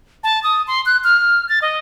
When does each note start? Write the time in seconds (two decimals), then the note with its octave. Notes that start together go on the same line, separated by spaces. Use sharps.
0.24 A5
0.43 D#6
0.67 C6
0.86 F#6
1.04 F6
1.49 A6
1.62 D#5